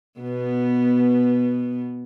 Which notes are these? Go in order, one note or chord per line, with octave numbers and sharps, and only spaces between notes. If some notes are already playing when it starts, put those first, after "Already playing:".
B2 B3